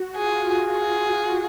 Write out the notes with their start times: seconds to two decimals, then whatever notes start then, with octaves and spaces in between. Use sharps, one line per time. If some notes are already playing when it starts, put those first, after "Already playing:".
Already playing: F#4
0.16 F4 G#4
0.71 G#4